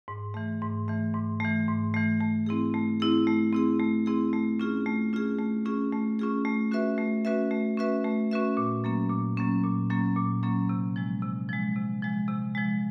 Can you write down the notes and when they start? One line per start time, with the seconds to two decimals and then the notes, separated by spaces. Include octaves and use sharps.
0.08 G#2
0.34 E3 A3
0.62 G#2
0.88 E3 A3
1.14 G#2
1.40 E3 A3
1.68 G#2
1.94 E3 A3
2.21 A3
2.46 C4 E4 G#4
2.74 A3
3.00 C4 E4 G#4
3.27 A3
3.53 C4 E4 G#4
3.80 A3
4.06 C4 E4 G#4
4.33 A3
4.60 C#4 F4 G#4
4.86 A3
5.13 C#4 F4 G#4
5.39 A3
5.66 C#4 F4 G#4
5.92 A3
6.19 C#4 F4 G#4
6.45 A3
6.71 C#4 F#4 B4 E5
6.98 A3
7.25 C#4 F#4 B4 E5
7.51 A3
7.77 C#4 F#4 B4 E5
8.05 A3
8.31 C#4 F#4 B4 E5
8.57 A#2
8.84 F#3 A#3 C#4
9.10 A#2
9.37 F#3 A#3 C#4
9.63 A#2
9.90 F#3 A#3 C#4
10.17 A#2
10.43 F#3 A#3 C#4
10.69 C3
10.96 F3 G#3
11.22 C3
11.49 F3 G#3
11.76 C3
12.02 F3 G#3
12.28 C3
12.55 F3 G#3